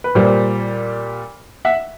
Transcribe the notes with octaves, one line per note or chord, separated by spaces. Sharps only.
B4
A#2 G3 A#3 C5
E5 F#5